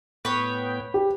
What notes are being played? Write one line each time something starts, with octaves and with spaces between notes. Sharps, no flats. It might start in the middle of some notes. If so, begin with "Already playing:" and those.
A2 B3 B4 C#5 G5
G4